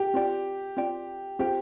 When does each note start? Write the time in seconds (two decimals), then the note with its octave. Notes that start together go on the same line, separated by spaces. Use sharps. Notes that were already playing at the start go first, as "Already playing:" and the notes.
Already playing: G4
0.14 C4 F4 D5 G5
0.77 C4 F4 D5 G5
1.39 C4 F4 G4 C5 G5